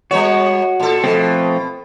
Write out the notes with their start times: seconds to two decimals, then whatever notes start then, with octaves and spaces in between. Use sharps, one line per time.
0.11 G3 B3 F#4 C#5
0.80 A2 A4
1.04 B2 F3 A3 C4